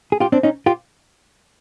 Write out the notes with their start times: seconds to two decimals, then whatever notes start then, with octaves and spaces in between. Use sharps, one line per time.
0.12 G#4
0.20 F4 G4
0.32 C4 D4
0.43 C#4 D#4
0.66 F4 G4